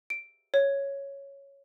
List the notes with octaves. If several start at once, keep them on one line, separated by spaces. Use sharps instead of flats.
D7
C#5